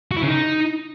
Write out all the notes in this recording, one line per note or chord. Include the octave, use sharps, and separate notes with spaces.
F#4
E4
C#3
D#4